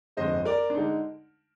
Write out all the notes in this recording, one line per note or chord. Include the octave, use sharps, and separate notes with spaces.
G1 F2 D3 G#3 C5 D#5
A#4 D5
D4
D3 G#3 D#4